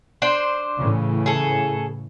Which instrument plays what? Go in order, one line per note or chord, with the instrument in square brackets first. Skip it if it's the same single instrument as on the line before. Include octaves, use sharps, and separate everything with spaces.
[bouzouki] D4 C5
[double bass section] A2 C#3 E3
[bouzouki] G#4 A4